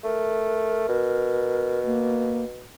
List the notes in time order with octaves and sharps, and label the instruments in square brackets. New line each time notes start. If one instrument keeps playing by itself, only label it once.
[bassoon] A3 [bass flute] A#4
[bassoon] B2
[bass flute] A#3